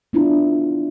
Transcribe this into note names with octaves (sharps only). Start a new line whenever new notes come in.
B3 D4 E4 F4